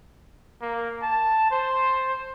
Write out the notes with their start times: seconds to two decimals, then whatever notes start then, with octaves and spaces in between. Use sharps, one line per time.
0.62 A#3
1.03 A5
1.51 C5